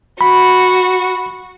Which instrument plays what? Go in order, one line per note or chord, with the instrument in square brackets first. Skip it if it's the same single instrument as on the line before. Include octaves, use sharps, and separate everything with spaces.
[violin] F#4 [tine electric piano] B5